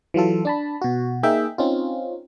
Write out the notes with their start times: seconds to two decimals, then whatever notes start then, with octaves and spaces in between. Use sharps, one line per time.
0.14 E3 F#3 F4 A4
0.45 D4 A5 B5
0.82 B2 F#4
1.23 A#3 D#4 G#4 E5 G5
1.58 C4 C#4 D#4 F4